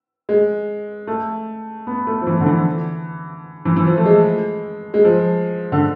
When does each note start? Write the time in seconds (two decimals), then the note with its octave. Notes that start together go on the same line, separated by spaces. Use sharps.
0.29 G#3
1.07 A3
1.87 B3
2.07 A3
2.21 F3
2.27 E3
2.41 D3
2.46 E3
3.65 E3
3.76 E3
3.86 F3
3.97 A3
4.05 G#3
4.94 G#3
5.05 F3
5.72 D3